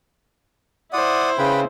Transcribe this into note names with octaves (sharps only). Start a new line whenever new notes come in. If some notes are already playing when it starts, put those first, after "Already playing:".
E4 C5 D5 F#5 D#6
C#3 B4 G5 B5